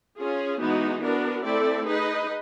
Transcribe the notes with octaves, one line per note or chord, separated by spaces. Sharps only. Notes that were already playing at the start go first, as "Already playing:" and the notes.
C#4 F4 G#4
E3 G#3 B3 D#4 F#4
B3 D4 F#4 A#4
A3 C4 E4 A4 D5
D#4 G#4 B4 D#5